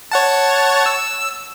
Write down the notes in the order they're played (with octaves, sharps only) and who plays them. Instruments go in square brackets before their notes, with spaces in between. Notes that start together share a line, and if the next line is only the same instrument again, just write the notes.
[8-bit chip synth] C#5 F#5 A5
E6